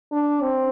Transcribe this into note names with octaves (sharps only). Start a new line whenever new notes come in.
D4
C4